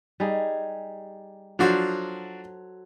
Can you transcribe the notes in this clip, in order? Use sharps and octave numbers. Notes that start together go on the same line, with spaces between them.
G3 D#4 G#4
F3 F#3 D4 F#4 A4 C5